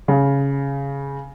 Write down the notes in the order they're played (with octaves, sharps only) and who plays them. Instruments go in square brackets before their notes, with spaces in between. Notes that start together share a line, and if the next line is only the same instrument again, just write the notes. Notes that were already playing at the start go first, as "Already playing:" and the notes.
[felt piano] C#3